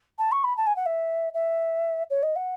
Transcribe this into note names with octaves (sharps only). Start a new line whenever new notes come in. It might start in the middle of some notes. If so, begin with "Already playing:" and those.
A5
C#6
B5
A5
G#5
F#5
E5
E5
C#5
D#5
F#5